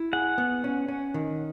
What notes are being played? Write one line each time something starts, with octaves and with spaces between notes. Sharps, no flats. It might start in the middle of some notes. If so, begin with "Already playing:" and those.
Already playing: E4
G#4 F#5
B3
C#4
C#4
D#3